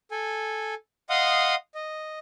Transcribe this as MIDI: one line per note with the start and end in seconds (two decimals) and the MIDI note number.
0.11 0.74 69
0.11 0.74 80
1.10 1.55 75
1.10 1.55 77
1.10 1.55 78
1.10 1.55 84
1.10 1.55 87
1.75 2.19 75